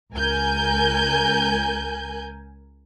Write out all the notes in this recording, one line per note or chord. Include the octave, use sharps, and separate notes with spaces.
C#2 A#4 G#5 G6